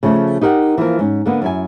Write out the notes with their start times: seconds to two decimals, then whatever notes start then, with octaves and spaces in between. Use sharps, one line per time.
0.03 C#3 F3 A3 C#5
0.41 D#4 G4 A#4 C#5 F#5
0.78 E3 F3 A#3 A#4
0.99 G#2 C#4
1.26 D3 A#3 B3
1.42 F#2 E4 G#5